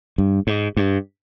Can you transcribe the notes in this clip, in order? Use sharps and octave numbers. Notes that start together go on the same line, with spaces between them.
G2
G#2
G2